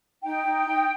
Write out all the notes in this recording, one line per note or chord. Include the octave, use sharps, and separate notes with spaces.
D#4 G5
D#4
D#4